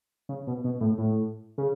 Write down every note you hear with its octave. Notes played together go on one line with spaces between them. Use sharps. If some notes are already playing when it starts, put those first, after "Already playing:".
C#3
B2
B2
A2
A2
C#3